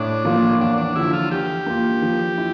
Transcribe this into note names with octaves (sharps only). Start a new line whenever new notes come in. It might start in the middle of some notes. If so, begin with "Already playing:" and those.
Already playing: A2 D4
F3 A#3 F4
E2 D4
D4
D3 F3 E4
F4
E3 G4
A#3 F4
F3
E4